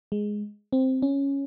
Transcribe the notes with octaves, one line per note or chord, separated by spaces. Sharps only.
G#3
C4
C#4